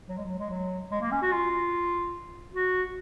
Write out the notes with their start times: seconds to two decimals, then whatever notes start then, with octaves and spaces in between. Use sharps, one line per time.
0.09 F#3
0.17 G#3
0.24 F#3
0.38 G#3
0.50 F#3
0.91 G#3
1.01 A#3
1.11 C#4
1.22 F#4
1.32 F4
2.53 F#4